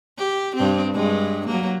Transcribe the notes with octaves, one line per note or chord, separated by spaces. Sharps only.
G4
G2 C4
G2 G#3
F#3 A#3